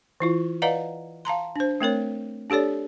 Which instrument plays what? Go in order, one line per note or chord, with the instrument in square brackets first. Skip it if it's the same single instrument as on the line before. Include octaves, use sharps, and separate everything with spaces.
[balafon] E3 E4 F4
B4 D5 D#5 F5 F#5 A#5
F5 A5 A#5 C6
D4 C5
A3 C4 A#4 C#5
D4 G4 A4 C#5 D5